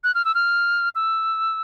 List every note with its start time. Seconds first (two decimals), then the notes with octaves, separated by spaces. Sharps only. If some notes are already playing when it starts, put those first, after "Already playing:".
0.04 F#6
0.15 F6
0.25 E6
0.35 F6
0.95 E6